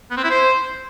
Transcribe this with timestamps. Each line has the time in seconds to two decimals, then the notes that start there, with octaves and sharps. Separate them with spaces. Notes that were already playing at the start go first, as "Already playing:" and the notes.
0.11 B3
0.17 C4
0.24 E4
0.30 C5